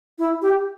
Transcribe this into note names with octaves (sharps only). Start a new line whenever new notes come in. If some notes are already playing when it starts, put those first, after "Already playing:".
E4
G4